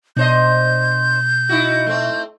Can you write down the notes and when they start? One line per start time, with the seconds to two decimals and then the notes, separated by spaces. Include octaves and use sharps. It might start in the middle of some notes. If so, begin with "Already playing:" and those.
0.17 B2 D4 C5 D#5 G6
1.49 D#4 E4 F#4
1.86 A3 C4